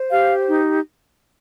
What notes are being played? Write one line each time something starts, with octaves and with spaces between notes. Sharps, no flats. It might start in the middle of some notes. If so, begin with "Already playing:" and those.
Already playing: C5
G4 F5
D#4